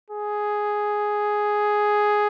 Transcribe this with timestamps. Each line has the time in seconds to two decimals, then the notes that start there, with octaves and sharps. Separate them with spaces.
0.11 G#4